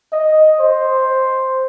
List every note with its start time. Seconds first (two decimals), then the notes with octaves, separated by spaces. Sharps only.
0.13 D#5
0.60 C5